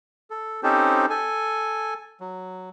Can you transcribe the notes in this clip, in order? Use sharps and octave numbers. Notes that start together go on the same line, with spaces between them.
A4
C4 C#4 D#4 G4 A4 C5
A4 G#5
F#3